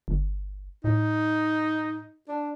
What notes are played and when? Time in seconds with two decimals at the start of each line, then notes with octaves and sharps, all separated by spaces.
0.08 G1
0.84 A2 D#4
2.28 D4